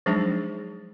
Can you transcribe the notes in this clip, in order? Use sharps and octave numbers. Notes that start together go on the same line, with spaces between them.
F3 F#3 G#3 D4 D#4 G#4